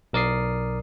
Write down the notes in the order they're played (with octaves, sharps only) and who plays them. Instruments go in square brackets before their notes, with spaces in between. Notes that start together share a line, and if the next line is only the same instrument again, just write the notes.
[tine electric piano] B1 A#4 D5 D#6 C7